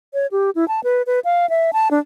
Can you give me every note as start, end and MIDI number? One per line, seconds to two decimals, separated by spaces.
0.14 0.27 73
0.32 0.50 67
0.55 0.67 64
0.68 0.80 81
0.84 1.02 71
1.07 1.20 71
1.25 1.49 77
1.50 1.71 76
1.73 1.88 81
1.91 1.99 62